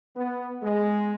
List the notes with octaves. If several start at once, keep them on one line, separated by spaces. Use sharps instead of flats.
B3
G#3